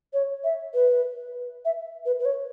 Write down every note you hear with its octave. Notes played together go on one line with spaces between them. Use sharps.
C#5
E5
B4
E5
B4
B4
C#5